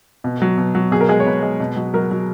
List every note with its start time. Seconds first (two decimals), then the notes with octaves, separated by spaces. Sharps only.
0.24 B2
0.42 F#3
0.58 B2
0.75 F#3
0.91 B2 G#4
1.01 A#4
1.09 G#3 G#4
1.20 C#5
1.26 B2 B4
1.43 G#3
1.60 B2
1.76 F#3
1.94 F#3 A#4
2.11 F#3